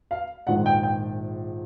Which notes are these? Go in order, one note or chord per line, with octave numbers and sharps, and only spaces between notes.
F5
A#1 G#2 D#3 G#3 F#5
G5
G5